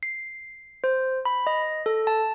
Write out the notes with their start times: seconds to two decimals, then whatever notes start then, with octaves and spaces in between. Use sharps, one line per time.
0.03 C7
0.84 C5
1.25 B5
1.47 D#5
1.86 A4
2.07 A5